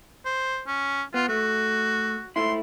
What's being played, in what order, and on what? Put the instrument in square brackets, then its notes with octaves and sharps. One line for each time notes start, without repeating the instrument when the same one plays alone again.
[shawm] C5
C#4
[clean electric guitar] B3 [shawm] F4
[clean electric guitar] A3 [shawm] F#4
[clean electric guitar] G#2 A3 E4 [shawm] C6